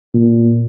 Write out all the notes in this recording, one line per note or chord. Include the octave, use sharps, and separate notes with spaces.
A#2